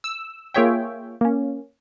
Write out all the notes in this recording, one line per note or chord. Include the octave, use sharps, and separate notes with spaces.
E6
A#3 F4 G#4 C#5 E5 G5
A#3 C#4